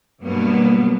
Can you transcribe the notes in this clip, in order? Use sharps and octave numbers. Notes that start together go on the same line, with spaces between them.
G2 B2 F#3 A#3 B3